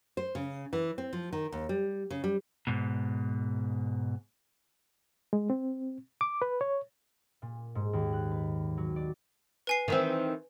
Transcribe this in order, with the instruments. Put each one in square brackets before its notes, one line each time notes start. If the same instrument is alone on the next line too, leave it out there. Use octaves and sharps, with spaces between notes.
[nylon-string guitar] C5
C#3
E3
C4
F3
D#3
D#2
G3
C#3
G3
[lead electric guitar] G#2 B2
[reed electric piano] G#3
C4
D6
B4
C#5
[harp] A#2
G#2
D#2
F#6
B4
F#3
D5
[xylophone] B4 G#5 C7
[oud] D#3 E3 C4